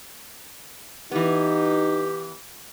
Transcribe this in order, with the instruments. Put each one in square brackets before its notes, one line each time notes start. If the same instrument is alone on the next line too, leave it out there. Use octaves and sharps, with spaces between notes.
[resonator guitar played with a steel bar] E3 B3 [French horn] D#4 [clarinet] G4